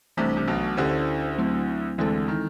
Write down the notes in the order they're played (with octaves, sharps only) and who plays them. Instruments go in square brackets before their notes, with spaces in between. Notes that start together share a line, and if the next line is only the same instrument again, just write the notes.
[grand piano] C2 C3 [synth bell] E3 A3 D4
[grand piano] C3
B1 B2
[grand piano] D2 D3 [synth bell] C#4 E4 G4 C5
[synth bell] F#3 A3 C4 E4
[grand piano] D2 D3 [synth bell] E3 G#3 C4 E4 A4
[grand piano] D#3